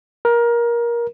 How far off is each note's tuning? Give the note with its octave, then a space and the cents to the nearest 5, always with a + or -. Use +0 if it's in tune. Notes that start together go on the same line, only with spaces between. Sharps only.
A#4 +20